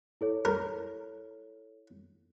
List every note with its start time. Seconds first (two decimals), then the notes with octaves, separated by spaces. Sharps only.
0.21 E4 A4 C#5
0.45 A#4